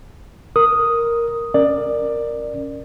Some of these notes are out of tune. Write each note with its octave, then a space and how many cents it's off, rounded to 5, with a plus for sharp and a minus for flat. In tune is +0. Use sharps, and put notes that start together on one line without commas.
A#4 +0 D#6 +0
C#4 +0 A#4 +0 D5 +15